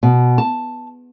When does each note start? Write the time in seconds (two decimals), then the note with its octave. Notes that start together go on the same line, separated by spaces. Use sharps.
0.03 B2
0.38 A5